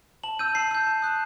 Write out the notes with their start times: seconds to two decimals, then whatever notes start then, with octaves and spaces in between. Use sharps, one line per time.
0.23 A5 F#7
0.39 E6 G6 D#7
0.55 A5 C7
0.71 E6 G6
0.87 A5
1.02 D#6 F#6